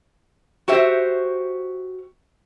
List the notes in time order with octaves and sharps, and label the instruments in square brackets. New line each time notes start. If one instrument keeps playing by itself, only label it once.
[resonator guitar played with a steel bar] F#4 G4 C5 E5